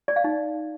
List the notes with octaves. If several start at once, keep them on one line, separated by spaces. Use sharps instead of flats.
D5
F5
D#4